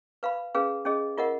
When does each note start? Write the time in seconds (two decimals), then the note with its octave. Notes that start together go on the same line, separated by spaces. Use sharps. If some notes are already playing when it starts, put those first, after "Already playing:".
0.23 B4 F5 B5
0.55 C#4 G#4 B4 F5
0.85 C#4 G#4 D#5
1.17 F4 A#4 D#5 F#5